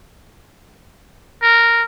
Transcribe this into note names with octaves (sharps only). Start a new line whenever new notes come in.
A#4